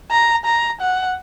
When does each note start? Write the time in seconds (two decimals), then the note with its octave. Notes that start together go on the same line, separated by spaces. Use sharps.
0.11 A#5
0.46 A#5
0.81 F#5